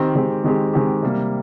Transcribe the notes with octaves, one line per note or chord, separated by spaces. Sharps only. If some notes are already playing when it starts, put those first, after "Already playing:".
Already playing: D#3 C4 G4
D#3 G#3 C4 G4
D#3 G#3 C4 G4
D#3 G#3 C4 G4
C3 G3 A#3